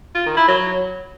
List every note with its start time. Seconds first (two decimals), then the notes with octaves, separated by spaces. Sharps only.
0.15 F4
0.26 D#3
0.37 E4
0.48 F#3